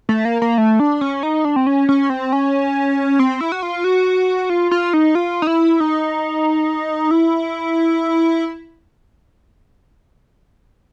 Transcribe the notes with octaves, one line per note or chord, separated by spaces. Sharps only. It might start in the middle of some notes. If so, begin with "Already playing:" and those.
A3
A#3
A#3
A3
D4
C#4
D#4
D4
C4
C#4
C#4
C4
C#4
C4
E4
F#4
F4
F#4
F4
F4
D#4
F4
D#4
E4
D#4
E4